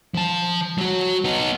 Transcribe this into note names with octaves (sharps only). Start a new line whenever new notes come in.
F3 A5
F#3 F#4
B3 D#4